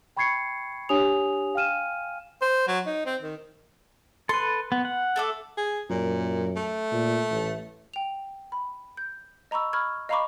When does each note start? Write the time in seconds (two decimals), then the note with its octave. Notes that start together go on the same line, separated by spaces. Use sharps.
0.17 G5 B5 C#6 G#6 C7 C#7
0.89 D4 G4 C#5 G#5 D#6 F7
1.55 F5 G5 G#5 F6 D#7 E7
2.42 C5
2.68 F#3
2.86 D#4
3.06 C4
3.23 D#3
4.29 A4 B4 C6
4.72 B3
4.85 F#5
5.16 A3 A4 D6
5.57 G#4
5.90 F#2 A#2
6.56 A3
6.92 A#2
7.30 A1
7.94 G5 F7
8.52 B5
8.97 G6
9.51 D#5 A#5 B5 C#6 E6
9.73 B5 C#6 F6 G#6
10.09 D#5 F5 A#5 B5 C#6 D6